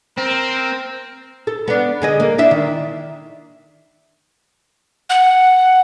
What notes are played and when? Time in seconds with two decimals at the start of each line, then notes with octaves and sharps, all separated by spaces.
0.18 C4 A#4
1.47 A4
1.68 B3 D4
2.02 D3 G#4 D#5
2.20 A#3
2.38 D4 E4 E5
2.51 D#3
5.10 F#5